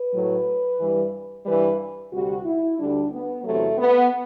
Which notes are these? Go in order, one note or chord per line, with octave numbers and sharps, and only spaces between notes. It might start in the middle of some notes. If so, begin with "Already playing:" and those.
Already playing: B4
A2 F#3
G2 E3 G3
G2 E3 G3 B4
D2 C3 G3 F#4
E4
D2 D3 G3 D4
B3
E2 C3 F#3 A3
B3